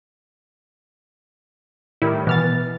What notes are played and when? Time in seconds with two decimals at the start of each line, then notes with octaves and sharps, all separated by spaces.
2.02 A2 D#3 G3 E4
2.27 B2 E3 F6 A6